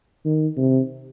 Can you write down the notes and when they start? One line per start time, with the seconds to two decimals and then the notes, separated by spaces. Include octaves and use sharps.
0.25 D#3
0.57 C3